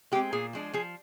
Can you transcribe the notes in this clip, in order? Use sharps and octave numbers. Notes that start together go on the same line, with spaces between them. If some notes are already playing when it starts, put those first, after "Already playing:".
G#3 C4 G4
A#2 G#4
F3 G#3 D4
F3 G#4